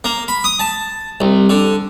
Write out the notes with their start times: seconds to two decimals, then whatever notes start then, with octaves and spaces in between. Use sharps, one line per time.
0.04 A#3
0.28 B5
0.44 D#6
0.59 A5
1.21 C2
1.50 D3